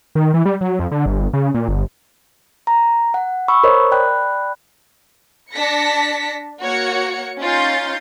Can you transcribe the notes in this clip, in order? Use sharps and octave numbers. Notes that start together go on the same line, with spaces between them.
D#3
E3
G3
F#3
F2
D3
G1
C#3
A#2
G1
A#5
F#5
B5 C#6 E6
A#4 C5 C#5 D#5
D5 G5 B5 F#6
D4 A5 A#6 B6 C#7
A#3 F#4 C#5 C#7
C#4 D#4 F4 C6 G6 A6